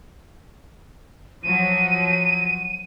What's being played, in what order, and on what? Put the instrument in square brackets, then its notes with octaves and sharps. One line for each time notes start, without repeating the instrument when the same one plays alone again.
[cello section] F3 F#3 [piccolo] D#7